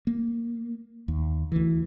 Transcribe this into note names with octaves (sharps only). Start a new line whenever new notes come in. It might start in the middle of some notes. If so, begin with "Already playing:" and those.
A#3
D#2
D2 E3